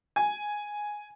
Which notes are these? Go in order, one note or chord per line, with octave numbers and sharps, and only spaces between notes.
G#5